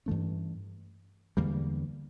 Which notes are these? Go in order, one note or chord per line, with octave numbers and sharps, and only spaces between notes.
G2 E3 A3 C#4
E2 D3 G3 A#3